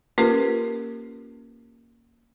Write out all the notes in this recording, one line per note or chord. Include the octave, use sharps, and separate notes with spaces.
A#3 C#4 F4 G4 A#4 B4